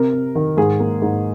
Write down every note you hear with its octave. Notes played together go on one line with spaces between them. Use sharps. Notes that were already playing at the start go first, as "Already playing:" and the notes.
Already playing: C3 A#4
C3
D#3
G#2 G#4
A#3
G#2